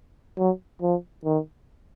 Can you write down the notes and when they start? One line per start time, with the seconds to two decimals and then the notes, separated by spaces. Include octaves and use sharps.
0.37 F#3
0.82 F3
1.25 D#3